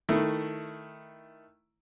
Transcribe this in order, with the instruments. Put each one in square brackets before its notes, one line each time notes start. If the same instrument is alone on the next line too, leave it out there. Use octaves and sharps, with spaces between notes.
[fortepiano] D#3 A3 E4